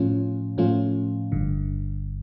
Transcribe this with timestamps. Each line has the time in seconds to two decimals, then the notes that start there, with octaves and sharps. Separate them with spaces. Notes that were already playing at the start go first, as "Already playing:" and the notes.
Already playing: A2 F3 A3 C#4 F4
0.58 A2 F3 A3 C#4 F4
1.32 G1 G2 D3